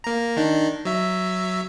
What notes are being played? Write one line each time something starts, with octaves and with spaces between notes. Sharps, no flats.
A#3 A#5
D#3 D4 D#4
F#3 E5